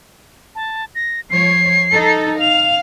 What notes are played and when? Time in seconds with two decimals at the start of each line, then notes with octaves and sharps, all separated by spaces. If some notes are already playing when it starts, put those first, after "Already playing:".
0.55 A5
0.95 A#6
1.30 F3 C#5 C7
1.91 D#4 A4
2.41 F5 F7